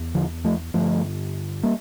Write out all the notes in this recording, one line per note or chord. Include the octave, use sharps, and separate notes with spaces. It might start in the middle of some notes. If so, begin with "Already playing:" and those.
Already playing: E2
D3 F3
F3 A3
G2 D3 F3 A3
G3 A#3